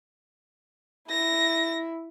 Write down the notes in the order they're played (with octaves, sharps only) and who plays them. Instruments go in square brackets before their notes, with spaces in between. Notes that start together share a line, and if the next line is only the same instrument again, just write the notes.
[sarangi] E4 [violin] A#6